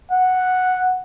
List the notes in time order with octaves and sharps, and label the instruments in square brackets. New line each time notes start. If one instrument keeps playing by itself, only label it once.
[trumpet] F#5